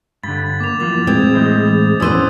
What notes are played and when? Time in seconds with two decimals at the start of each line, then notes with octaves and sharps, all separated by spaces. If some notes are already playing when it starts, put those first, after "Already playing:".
0.23 G2 D3 B5 A6
0.60 A#3 D6 F7
0.80 F#2 E3 F3 A6
1.07 A2 G#3 C4 D#6 G#6
1.34 E3 C5 D#5
2.00 B3 C#4 E4 C5 D#6 E6 D#7